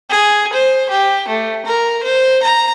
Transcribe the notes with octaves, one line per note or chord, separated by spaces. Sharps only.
G#4
C5
G4
A3
A#4
C5
A#5